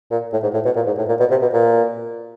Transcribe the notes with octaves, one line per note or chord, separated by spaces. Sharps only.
A#2
A2
G#2
A2
B2
A#2
G#2
A2
A#2
B2
C3
B2
A#2